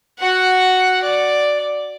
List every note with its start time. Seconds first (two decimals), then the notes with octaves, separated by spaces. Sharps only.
0.19 F#4 F#5
1.03 D5